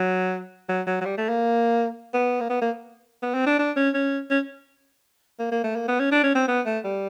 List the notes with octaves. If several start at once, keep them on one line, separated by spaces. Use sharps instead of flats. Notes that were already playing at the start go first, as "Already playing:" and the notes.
Already playing: F#3
F#3
F#3
F#3
G3
A3
A#3
B3
A#3
B3
A#3
B3
C4
D4
D4
C#4
C#4
C#4
A#3
A#3
A3
A#3
B3
C#4
D4
C#4
C4
B3
A3
G3